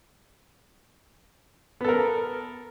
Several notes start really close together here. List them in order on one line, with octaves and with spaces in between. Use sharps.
B3 A4 A#4